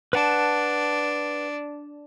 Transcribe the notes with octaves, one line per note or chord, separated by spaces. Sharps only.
D4 B4 F#5 A5